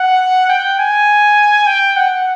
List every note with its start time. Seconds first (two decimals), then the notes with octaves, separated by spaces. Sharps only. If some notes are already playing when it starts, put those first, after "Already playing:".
Already playing: F#5
0.49 G5
0.79 G#5
1.67 G5
1.96 F#5